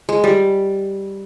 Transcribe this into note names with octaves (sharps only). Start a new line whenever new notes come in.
G#3
G3